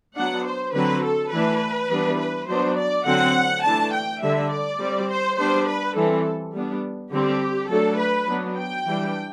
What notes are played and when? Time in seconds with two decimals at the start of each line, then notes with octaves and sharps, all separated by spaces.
0.16 F#3 B3 D4 F#5
0.46 C5
0.75 D3 F#3 C4 B4
1.03 A4
1.33 E3 A3 D4 B4
1.90 E3 G3 B3 D4
2.19 B4
2.48 F#3 B3 D4 C5
2.77 D5
3.07 D3 F#3 C4 F#5
3.64 E3 A3 D4 A5
3.94 G5
4.22 D3 G3 D4 E5
4.52 D5
4.80 G3 C4
5.10 C5
5.38 G3 B3 D4 C5
5.67 B4
5.96 E3 G3 C4 A4
6.54 G3 B3 D4
7.12 D3 G3 C4 G4
7.70 F#3 A3 D4 A4
7.99 B4
8.28 F#3 B3 D4
8.58 G5
8.86 E3 G3 D4